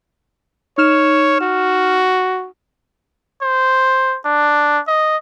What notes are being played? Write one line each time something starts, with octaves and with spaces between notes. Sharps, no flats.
D#4 C#5 F6 E7
F#4
C5
D4
D#5